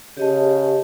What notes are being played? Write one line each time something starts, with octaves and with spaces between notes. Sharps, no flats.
C#3 G4 D#5 A5